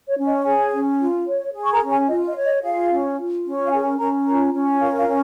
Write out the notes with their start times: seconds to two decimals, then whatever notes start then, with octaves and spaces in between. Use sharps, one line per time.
0.08 C#5
0.17 C#4
0.27 D#5
0.45 G#4 C#5 G#5
0.72 C#4
1.00 F4
1.26 C#5
1.54 G#4
1.64 C#6
1.72 A#4 A#5
1.80 C#4
1.90 G#4 G#5
2.08 F4 D#5
2.27 D#5
2.36 C#5
2.44 D#5
2.62 F4 G#4 F5
2.90 C#4
3.18 F4
3.44 C#4
3.67 F5
3.72 G#4 A#4 G#5
3.98 C#4 A#4 A#5
4.26 F4 A#4 A#5
4.53 C#4
4.80 F4 A#4 F5
4.98 F4 F5
5.08 C#4